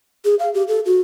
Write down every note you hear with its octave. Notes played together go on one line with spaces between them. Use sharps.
G#4
F5
G4
A4
F#4